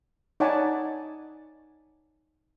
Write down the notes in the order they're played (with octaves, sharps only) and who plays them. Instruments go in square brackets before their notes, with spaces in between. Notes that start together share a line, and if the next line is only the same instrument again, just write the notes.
[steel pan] D#4 C#5 D5 F#5 G#5 A5